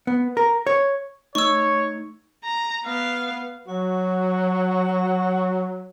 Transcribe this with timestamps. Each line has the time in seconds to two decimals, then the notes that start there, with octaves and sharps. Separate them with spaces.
0.07 B3
0.37 A#4
0.67 C#5
1.35 A3 D#4 C#5 C#6 E6
2.44 A#5
2.84 B3 F5
3.67 F#3 F#4